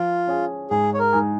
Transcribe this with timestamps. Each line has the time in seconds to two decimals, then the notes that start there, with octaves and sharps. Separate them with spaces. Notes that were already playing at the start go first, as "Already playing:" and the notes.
Already playing: F3 F4
0.28 C#4 G#4
0.70 G#2 G#4
0.94 C#5
0.99 A#4
1.13 G#3 D#4 G#4